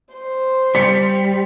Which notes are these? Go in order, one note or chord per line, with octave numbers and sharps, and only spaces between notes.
C5
G3 B6 C#7